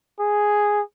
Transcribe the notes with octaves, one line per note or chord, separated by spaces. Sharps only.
G#4